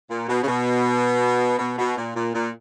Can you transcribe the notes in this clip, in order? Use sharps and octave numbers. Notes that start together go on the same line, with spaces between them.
A#2
B2
C#3
B2
B2
B2
A#2
A#2
A#2